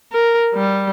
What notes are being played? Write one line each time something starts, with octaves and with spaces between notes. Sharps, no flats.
A#4
G3